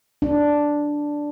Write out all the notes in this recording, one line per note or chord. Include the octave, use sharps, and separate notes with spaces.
D4